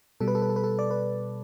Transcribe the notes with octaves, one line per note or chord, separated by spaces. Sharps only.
B2 G3 A4
B4
A4
B4
A4
B4
A4
D5
B4